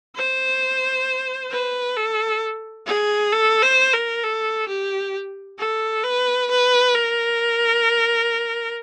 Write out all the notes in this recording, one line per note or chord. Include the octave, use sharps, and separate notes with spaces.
C5
B4
A4
G#4
A4
C5
A#4
A4
G4
A4
B4
B4
A#4